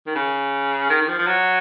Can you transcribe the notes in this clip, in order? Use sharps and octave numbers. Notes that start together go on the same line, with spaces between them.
D#3
C#3
D#3
D#3
F3
F3
F#3